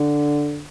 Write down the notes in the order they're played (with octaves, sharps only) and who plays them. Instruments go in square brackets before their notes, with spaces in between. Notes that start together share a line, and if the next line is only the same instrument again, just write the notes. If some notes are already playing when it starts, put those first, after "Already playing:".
Already playing: [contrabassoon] D3